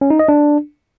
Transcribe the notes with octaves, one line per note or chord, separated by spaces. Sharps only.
C#4
D#4
D#5
D4